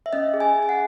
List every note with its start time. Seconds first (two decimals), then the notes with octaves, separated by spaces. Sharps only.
0.06 E5
0.13 C#4 D#5
0.34 G#4
0.40 G#5
0.55 G#4
0.63 G#5
0.69 F#5